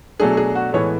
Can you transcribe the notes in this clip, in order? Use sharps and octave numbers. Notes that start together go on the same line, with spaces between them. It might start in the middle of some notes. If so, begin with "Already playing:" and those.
B2 F#3 A3 D4 G#4
G#4
F#4
A2 E3 G#3 B3 C#5